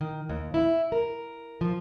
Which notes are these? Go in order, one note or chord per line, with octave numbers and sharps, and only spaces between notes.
D#3
D#2
E4
A#4
F3